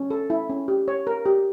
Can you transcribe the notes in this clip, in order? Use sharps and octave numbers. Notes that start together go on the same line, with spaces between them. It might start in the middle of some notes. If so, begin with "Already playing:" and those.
Already playing: C#4
A4
E4
C#4
G4
C#5
A#4
G4